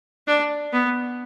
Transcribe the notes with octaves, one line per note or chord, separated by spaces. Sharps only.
D4
B3